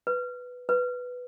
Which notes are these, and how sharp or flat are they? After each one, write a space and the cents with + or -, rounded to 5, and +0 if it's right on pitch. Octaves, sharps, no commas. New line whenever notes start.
B4 +5
B4 +5